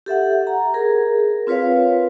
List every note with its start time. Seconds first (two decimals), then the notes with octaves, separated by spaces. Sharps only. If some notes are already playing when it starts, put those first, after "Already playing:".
0.06 G4 A4 E5 F#5
0.47 A#5
0.74 G#4 A#4
1.47 C4 F4 B4 C#5 F5